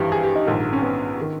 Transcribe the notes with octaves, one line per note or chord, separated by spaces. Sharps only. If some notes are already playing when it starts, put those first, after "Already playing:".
Already playing: G#1 G2 E3 G4
G#4
G4
D#4
A#1 G#2 D#3
C#4
B3
D#3